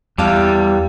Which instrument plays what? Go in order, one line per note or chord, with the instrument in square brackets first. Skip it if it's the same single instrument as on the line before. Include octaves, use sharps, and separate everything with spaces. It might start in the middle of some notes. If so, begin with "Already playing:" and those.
[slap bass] E2 [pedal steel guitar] G3 [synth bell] F5 A5 D6